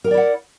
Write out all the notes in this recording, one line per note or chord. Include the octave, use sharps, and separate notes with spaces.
E4 A#4 D5 F#5 G5